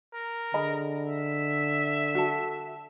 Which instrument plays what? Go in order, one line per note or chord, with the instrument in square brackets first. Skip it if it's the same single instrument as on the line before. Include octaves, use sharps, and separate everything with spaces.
[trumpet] A#4
[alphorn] D3 [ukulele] G#4 D#5 B5
[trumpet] E5
[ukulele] F#4 A4